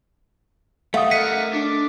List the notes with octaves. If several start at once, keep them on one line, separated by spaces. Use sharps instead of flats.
A3 F5 F#5 D#6
A#4 D#5 F#5 B6 C#7 D#7
D4